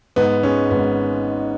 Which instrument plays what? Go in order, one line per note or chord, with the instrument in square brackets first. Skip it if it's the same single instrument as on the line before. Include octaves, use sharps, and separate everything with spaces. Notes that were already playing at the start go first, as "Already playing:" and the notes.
[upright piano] G#2 [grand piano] B3
[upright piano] G#3 [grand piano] C#4
[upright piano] G#1 [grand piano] B3